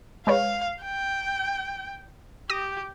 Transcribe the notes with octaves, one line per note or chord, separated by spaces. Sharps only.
G#3 B4 C#5 F5
G5
G4 D#6 A#6